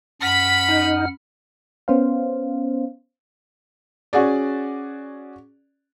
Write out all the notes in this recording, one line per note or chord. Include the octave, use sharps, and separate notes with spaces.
F#2 F#5 B5 F6 B6
D#4
B3 C#4 C5 F5
C#4 F#4 G#4 D5